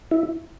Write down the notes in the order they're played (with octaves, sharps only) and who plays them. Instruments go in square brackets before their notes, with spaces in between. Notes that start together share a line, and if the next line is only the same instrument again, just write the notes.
[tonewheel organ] E4